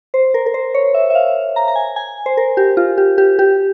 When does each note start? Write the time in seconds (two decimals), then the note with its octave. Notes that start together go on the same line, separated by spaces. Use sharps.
0.14 C5
0.34 A#4
0.46 A#4
0.54 C5
0.74 C#5
0.94 E5
1.10 E5
1.15 F5
1.56 A#5
1.68 A#5
1.75 G#5
1.96 G#5
2.26 C5
2.37 A#4
2.57 G4
2.77 F4
2.98 G4
3.18 G4
3.39 G4